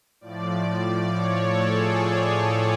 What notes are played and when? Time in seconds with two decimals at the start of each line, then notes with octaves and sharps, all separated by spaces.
0.21 A2 F3 D5
1.10 C#5
1.40 A4
1.70 G#4
2.00 A4
2.30 G#4